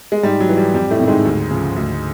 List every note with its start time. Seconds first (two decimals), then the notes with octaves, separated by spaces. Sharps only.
0.12 G#3
0.23 G#2 G3
0.40 F#3
0.49 E3
0.57 G3
0.74 F2 G3
0.90 A2 A3
0.99 C3 D#3
1.08 G#2 G#3
1.25 D2
1.51 C#3 F3
1.76 D2